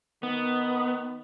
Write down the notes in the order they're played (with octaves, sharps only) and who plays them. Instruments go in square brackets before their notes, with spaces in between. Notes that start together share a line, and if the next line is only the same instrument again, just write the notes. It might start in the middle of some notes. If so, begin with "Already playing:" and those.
[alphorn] D#3 [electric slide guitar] B3